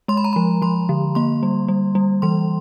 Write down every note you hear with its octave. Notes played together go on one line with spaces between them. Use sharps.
G#3 C6
B5
A#5
F3 B5
F3 C6
D3
A#3 C6
G3
G3
G3
E3 C6